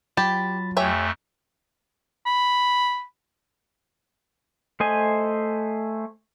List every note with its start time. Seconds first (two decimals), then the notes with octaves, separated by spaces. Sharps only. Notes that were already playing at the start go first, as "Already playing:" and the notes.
0.17 F#3 F4 G4 A5 B5 A6
0.77 F2 A3 G4 C#5 E5 G#5
2.26 B5
4.80 A3 C5 D#5 G#5